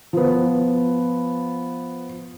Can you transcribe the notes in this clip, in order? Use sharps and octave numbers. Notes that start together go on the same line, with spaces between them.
F3 B3